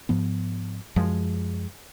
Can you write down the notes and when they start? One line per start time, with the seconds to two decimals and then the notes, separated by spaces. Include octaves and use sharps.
0.09 G#2 F3 B3
0.96 F#2 F3 G#3